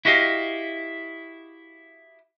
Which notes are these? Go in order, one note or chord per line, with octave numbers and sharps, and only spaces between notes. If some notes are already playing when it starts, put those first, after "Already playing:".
E4 F#4 G4 D#5 F5